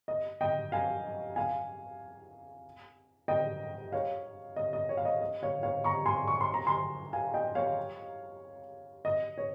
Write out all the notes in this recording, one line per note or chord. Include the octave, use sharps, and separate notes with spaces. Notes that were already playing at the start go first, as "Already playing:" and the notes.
D#5
D#5 G5
F5 G#5
F5 G#5
D#5 G5
C#5 F5
D#5
D#5
C#5
F5
D#5
D#5
C#5 F5
C#5 F5
A#5 C#6
G#5 C6
C#6
C6
A#5
G#5 C6
F5 G#5
D#5 G5
C#5 F5
D#5
C#5